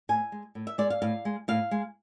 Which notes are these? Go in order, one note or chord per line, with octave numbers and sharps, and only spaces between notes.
A2 G#5
G#3
A2
E5
G#3 D5
F5
A2 F5
G#3
A2 F5
G#3